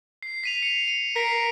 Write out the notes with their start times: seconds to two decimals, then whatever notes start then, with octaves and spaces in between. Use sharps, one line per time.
0.23 C7
0.44 B6 D#7 F7
0.62 C#7
0.88 D#7
1.16 A#4 B6 C7 D7